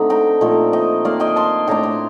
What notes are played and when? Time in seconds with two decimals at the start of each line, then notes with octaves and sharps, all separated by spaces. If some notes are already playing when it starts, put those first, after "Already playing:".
Already playing: D3 A3 C4 D#4
0.10 G5 A#5
0.41 A#2 F3 A3 D#4
0.73 D#5 G5
1.05 D#3 A#3 D4 D5 F5
1.20 D#5 G5
1.36 A5 C6
1.68 A2 A3 D4 G5 A#5
1.83 C6